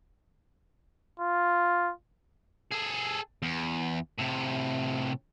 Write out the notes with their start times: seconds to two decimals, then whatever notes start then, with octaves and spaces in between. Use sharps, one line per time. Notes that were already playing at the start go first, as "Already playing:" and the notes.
1.20 F4
2.71 G#4 A4
3.42 E2
4.19 A2 C3